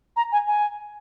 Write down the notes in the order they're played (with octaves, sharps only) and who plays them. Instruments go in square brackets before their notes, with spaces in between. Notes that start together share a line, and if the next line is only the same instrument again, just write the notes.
[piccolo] A#5
G#5
G#5